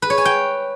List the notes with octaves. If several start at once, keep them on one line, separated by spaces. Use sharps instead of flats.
B4
C#5
G#5
G5